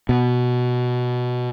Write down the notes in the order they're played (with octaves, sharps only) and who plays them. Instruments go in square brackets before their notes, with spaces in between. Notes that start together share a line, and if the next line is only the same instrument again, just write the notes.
[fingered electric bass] B2